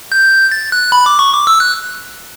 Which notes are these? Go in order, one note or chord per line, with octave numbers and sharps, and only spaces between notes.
G6
A6
F#6
B5
D6
C#6
D6
E6
F#6